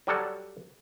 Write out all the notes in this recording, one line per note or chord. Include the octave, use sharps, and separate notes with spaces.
F#3 G3 A4 F#5 A5